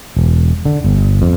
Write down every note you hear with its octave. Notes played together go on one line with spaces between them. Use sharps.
E1
D3
G1
F2